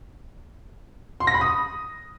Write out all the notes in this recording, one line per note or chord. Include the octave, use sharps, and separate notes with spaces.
C6
A#6
B5
D#6